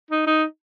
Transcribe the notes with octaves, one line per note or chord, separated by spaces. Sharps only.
D#4
D#4